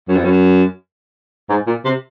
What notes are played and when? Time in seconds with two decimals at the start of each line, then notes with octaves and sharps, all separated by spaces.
0.08 F#2
0.16 F2
0.24 F#2
1.49 G#2
1.67 A#2
1.85 C3